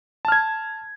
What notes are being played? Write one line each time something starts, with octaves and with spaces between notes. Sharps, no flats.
A5 F6 G#6